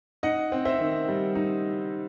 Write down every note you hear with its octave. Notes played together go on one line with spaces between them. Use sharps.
D#4 D#5 F#5
C4
C5 E5
D#3
G3
D#4